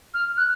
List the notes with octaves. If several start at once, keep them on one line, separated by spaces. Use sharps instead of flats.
F6
F#6